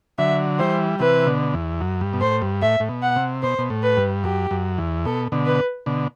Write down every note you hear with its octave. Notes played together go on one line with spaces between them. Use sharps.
D3 F#3 E5
E3 G3 C5
C3 E3 B4
B2 D3
E2
F#2
G2
B2
A2 C5
G2
A2 E5
A2
B2
F#5
C3
B2 C5
B2
A2
B4
G2
F#2 G4
F#2
E2
B2 A4
B2 D3
B4
B2 D3